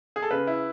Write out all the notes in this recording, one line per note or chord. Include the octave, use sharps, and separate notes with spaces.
G#4
A4
C#3 B4
E4